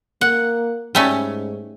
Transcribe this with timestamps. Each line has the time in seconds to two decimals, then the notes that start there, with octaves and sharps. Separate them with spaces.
0.21 A#3 F#5
0.95 G#2 G3 A3 C#4